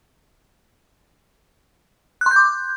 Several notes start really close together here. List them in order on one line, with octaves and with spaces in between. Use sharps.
F#6 C6 G6 D6